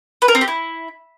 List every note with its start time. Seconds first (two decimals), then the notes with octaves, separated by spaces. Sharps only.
0.22 B4
0.28 A#4
0.35 C4
0.41 G4
0.48 E4